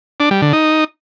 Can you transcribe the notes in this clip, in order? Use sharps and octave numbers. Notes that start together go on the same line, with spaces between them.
D4
G3
D3
D#4